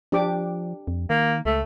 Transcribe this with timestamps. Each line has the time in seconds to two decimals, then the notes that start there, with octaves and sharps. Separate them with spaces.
0.12 F3 D4 G4 D6
0.88 F2
1.10 D#3 A#3
1.45 C#2 A3